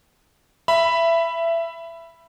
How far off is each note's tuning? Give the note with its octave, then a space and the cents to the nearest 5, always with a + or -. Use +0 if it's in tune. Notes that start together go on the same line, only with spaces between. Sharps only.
E5 +20 B5 +0